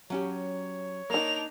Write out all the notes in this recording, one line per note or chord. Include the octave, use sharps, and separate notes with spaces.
F#3 C#4 G4 C#5
A#3 D4 D#4 F7